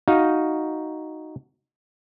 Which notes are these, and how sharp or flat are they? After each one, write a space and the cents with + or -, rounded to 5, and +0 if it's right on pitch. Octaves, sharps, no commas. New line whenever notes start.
D#4 +0 F#4 +0 F5 +0